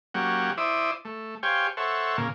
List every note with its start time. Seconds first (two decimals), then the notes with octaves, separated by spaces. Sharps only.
0.14 F#3 A#3 C#4 G4 F#5
0.58 E4 C5 D5 E5 D#6
1.05 A3
1.43 G4 C5 C#5 F5 G5 G#5
1.77 A4 C5 C#5 E5 F#5
2.18 A#2 C#3 A#3